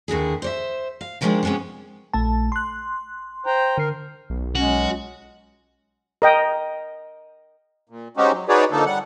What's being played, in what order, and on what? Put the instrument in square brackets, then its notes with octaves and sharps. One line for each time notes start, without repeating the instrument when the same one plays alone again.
[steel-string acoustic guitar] D#2 D3 E4 G#4
C5 C#5 E5
F5
D3 D#3 F3 G3 G#3 D4
C3 E3 G#3 B3 C#4
[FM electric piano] A#1 A3 A5
C6 F#6
[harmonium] C5 G5 A#5
[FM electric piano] D3 C7 [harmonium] A#4
[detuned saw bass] B1
[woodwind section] F#3 G#3 C#4 [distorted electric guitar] F#4
[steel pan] A#4 D#5 G5
[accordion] A#2
G#3 C4 C#4 D#4 F#4 G4
F#3
D#4 F#4 G#4 B4 C#5 D5
D3 F3 A#3 D#4 A4
G3 F#5